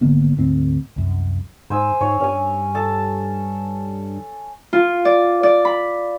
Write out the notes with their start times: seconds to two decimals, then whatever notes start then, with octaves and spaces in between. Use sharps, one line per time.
0.01 G#1 D3 A#3 B3
0.37 D2 G#2 C4
0.96 C2 F#2
1.70 G#2 C5 G#5 E6
2.01 G#2 C#5
2.20 G2 C#4 G#5
2.75 A4 A5
4.73 F4
5.05 D5
5.43 D5
5.65 B5